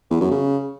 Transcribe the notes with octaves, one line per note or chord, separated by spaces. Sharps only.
E2
F#2
C#3